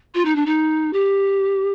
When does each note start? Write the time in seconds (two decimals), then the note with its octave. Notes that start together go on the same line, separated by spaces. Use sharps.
0.14 F4
0.25 D#4
0.35 D4
0.46 D#4
0.93 G4